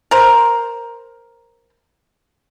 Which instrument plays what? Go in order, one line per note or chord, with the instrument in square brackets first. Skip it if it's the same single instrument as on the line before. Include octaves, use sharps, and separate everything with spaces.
[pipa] A#4 C5